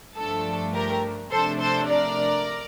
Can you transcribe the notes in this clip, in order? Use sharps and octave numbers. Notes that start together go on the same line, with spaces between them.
G2 F3 A3 D4 A4
G4 A#4
C3 F3 A3 D4 A4 C5
A4 C5
A#4 D5